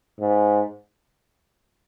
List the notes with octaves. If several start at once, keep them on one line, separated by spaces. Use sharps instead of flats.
G#2